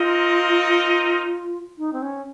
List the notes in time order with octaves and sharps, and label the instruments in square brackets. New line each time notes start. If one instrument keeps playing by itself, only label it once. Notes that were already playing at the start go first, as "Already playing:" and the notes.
Already playing: [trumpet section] C4 D#4 A#4 D#5 [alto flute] F4
[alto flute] D#4
C4
C#4